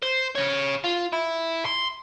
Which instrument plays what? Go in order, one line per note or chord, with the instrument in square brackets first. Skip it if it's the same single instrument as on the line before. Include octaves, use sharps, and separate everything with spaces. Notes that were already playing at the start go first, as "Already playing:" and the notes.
[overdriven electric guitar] C5
C#3 C#5
F4
E4
C6